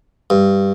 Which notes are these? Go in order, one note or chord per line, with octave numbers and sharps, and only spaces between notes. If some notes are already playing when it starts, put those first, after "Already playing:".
G2